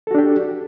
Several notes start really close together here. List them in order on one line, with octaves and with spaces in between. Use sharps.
A4 F#4 D4 G4